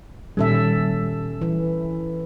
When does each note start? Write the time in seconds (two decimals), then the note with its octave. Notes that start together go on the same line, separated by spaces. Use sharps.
0.37 A#2 D#3 G3 C#4 A4 E5
1.41 E3